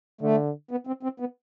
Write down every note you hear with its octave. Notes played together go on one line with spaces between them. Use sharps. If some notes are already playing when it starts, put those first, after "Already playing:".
D3 A3
B3
C4
C4
B3